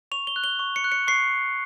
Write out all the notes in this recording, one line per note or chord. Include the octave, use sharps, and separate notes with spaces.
C#6 F7
G7
F#6
G7
C#6
C#7
F#6
C#7
C#6 C7